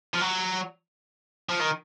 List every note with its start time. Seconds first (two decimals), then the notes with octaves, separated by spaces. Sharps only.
0.14 F3
0.21 F#3
1.49 F3
1.60 D#3